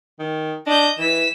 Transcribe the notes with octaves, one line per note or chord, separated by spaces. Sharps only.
D#3
D4 D#5 G6
E3 B6 E7